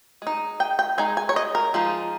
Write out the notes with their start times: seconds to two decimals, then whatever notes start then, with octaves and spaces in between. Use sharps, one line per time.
0.22 G#3 D#4
0.60 G5
0.79 G5
0.98 G#3 D#4 G#5
1.17 G#5
1.29 C#5
1.36 D#5
1.55 A#4
1.74 F3 G#3 D#4